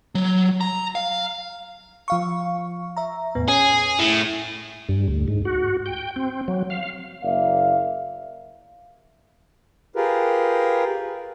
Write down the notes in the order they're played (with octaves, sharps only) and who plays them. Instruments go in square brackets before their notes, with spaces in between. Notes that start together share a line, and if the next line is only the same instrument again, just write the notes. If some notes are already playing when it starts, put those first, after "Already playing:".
[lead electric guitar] F#3
A#5
F5
[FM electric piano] F3 F5 C#6
E5 A#5
E2 A2 B3
[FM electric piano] C#4 [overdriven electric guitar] G#4
[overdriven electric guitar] A2
[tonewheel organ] G2
D2
G#2
F#4
G5
C4
F#3
F5
[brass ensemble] F#1 A#3 D5 E5 F5
[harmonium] F4 G4 G#4 A#4 B4